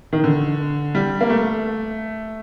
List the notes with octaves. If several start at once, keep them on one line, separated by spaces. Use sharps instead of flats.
D#3
D3
G3
A#3
A3